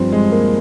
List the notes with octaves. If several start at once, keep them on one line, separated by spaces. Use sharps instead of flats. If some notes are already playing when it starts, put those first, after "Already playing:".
Already playing: G2 F3 C4
G#3
A#3